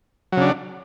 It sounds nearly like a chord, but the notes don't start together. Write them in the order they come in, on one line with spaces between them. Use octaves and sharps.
F#3 C#3 D4